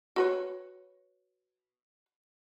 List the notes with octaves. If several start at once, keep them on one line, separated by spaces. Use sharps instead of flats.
F#4 B4 C#5